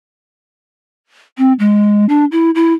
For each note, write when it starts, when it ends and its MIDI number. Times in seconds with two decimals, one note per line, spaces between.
1.38 1.53 60
1.59 2.05 56
2.09 2.25 62
2.32 2.51 64
2.55 2.73 64